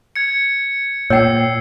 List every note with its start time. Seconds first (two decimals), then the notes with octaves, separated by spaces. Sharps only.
0.16 G#6 C#7
1.10 A#2 C#5 G5 E6 C7